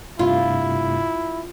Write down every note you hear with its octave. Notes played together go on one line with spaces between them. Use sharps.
G2 C3 A3 E4 F4